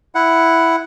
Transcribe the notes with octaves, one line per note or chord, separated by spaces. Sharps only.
E4 F#5